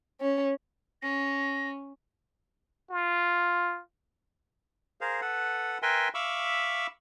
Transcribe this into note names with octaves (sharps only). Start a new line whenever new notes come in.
C#4
C#4 A#6
F4
G#4 A#4 C5 F5
A4 B4 F#5
A#4 B4 E5 G5 G#5 C6
E5 F5 B5 C#6 D6 E6